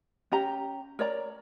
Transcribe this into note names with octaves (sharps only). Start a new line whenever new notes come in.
C#4 G4 A#5
A#4 C#5 D5 A#5